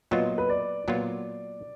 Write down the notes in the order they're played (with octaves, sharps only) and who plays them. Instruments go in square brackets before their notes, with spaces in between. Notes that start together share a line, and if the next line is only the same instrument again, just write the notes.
[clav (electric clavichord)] A#2 F#3 B3 F4 [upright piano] D#5
[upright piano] B4
D5
[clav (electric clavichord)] A#2 F#3 B3 F4